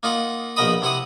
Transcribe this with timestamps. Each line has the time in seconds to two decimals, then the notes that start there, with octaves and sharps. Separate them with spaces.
0.03 A#3 D#4 F4 F#5
0.56 A#1 B2 A#4 D#5 B5 D#6
0.82 C3 E4 F#5 D#6